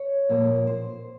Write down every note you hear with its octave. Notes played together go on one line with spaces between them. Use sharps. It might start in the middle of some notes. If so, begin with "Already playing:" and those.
Already playing: C#5
A#2 F3 A#3
C5